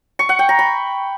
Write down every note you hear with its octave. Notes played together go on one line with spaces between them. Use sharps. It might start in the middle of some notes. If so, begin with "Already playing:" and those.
C#6
F#5
G5
A#5
B5